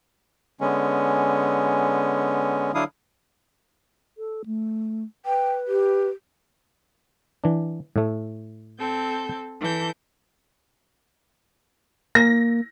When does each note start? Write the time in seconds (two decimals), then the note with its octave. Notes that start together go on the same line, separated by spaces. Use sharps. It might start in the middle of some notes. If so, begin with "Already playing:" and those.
0.61 D3 G#3 B3 C#4
2.75 D3 F#3 D4 E4 F5 D#6
4.18 A4
4.45 A3
5.26 B4 G5
5.68 G4
7.44 E3 D4
7.96 A2 A3
8.79 C4 A4 G6
9.60 E3 A4 G6
12.15 A#3 A#6